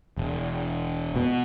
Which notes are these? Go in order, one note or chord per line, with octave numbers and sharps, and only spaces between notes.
E1
B2